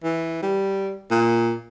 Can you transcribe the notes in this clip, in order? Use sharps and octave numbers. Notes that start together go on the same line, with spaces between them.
E3
G3
A#2